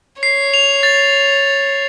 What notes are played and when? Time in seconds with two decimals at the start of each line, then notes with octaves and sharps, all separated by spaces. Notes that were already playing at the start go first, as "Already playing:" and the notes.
0.22 C#5 C7
0.54 F7
0.83 A6